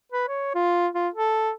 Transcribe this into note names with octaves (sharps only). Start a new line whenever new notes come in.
B4
C#5
F4
F4
A4